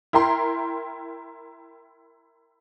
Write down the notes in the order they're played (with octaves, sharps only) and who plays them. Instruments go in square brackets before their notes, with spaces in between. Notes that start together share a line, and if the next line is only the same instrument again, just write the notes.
[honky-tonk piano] E4 A#4 G5 A#5 C6